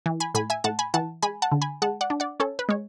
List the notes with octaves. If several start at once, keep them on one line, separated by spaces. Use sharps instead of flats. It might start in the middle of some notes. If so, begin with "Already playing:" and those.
E3
G#5 B5
A2 G#5 B5
E5 G#5
A2 F#5 A5
G#5 B5
E3 F#5 A5
G#3 G#5 B5
F#5 A5
D3
G#5 B5
G#3 F#5 A5
D5 F#5
D4
D5 F#5
C#4 A4 C#5
B4
G#3 C#5